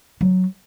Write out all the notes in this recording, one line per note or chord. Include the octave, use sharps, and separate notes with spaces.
F#3